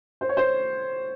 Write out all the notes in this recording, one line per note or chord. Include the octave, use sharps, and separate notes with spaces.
C5
C#5
C5